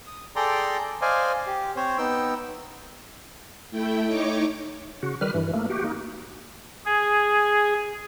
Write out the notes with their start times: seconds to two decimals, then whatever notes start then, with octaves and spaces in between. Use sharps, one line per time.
0.07 D#6
0.36 G#4 A4 D5 G5 A#5 C6
1.02 C5 D5 D#5 F5 G#5
1.47 G4
1.76 C4 C5 C#5
1.98 B3 D#4 G5 E6
3.71 A3 E4 G5
4.05 D#4 C#5 C#6 D6
5.03 C#3 F#4
5.21 D#3 G3 B4 F6
5.34 G2 E3
5.53 A3 A#3
5.70 F#4 G4
5.84 A#3 D#4
6.86 G#4